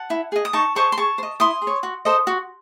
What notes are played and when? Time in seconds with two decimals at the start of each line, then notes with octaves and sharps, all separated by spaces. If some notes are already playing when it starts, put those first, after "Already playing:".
Already playing: F#5 A5
0.10 E4
0.32 G#4 D#5
0.45 D#6
0.53 D#4 A5 C#6
0.75 G#4 C5 D#5 A5 C#6
0.92 C6
0.97 G#4 A5 C#6
1.18 C5
1.23 D#5
1.40 E4 C6 D#6
1.62 G#4
1.67 C#5
1.83 F#4
2.05 A4 C5 D#5
2.27 F#4